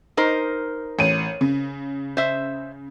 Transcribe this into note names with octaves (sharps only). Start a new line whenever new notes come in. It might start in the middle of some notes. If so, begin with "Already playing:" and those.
D#4 A#4 C5
A1 D#7
C#3
C5 E5